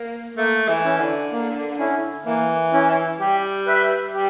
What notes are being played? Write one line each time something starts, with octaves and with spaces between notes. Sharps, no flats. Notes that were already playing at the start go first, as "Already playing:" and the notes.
Already playing: A#3
A3 A#3
E3
C#4 E4
D3
A#3
C#4 E4
E3 A#3
C#4 E4
G3 G4
B4 E5
G3 G4